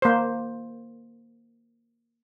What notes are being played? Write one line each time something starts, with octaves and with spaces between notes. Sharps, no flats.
A#3 C5